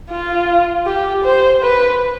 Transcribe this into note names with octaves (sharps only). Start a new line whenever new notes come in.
F4
G4
C5
B4